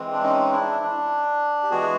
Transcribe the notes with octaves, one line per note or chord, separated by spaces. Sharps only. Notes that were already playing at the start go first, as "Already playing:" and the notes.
Already playing: E3 G#3 C4
D4
C#4 D#4
D4 E4
D4
G4
E3 G#3 B3 F#4 G#4